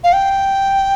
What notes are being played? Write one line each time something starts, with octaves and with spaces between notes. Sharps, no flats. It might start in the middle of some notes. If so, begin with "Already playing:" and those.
F5
G5